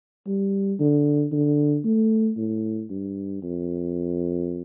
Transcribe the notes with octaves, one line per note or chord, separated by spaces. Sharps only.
G3
D3
D3
A3
A2
G2
F2